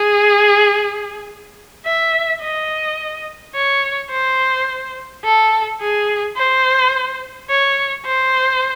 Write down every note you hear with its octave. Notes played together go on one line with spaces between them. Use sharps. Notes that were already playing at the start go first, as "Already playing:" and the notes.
Already playing: G#4
E5
D#5
C#5
C5
A4
G#4
C5
C#5
C5